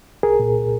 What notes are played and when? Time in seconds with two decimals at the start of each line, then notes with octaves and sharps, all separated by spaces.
0.23 C2 G#4 A#4
0.40 A#2